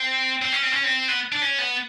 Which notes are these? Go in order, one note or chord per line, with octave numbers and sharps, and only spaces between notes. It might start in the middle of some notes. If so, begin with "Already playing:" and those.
Already playing: C4
C4
C#4
C4
C#4
C4
B3
D4
C#4
B3